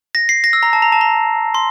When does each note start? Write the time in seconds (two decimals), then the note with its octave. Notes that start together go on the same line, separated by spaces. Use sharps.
0.15 A#6
0.29 C7
0.44 A#6
0.53 E6
0.63 A#5
0.73 A5
0.82 A#5
0.92 A5
1.01 A#5
1.54 C6